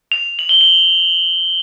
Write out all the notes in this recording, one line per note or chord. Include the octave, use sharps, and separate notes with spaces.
F7
F#7
G7
F#7